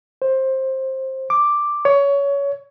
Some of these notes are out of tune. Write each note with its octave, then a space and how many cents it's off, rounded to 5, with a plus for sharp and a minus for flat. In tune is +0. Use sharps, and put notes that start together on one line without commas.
C5 +15
D6 +5
C#5 +20